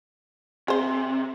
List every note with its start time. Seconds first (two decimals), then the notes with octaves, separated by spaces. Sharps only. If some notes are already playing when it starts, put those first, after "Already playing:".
0.68 C3 G#4 C5